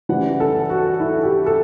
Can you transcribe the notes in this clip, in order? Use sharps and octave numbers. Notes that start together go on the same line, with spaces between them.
C#3 E3 G3 F#5
A4
F#4
E4
G4
A4